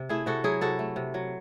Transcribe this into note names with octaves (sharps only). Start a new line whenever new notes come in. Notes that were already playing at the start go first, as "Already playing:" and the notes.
Already playing: C3
A3 E4 G#4
C3 F#4 A4
F#3 E4 G#4
C3 F#4 A4
A3
C3
F#3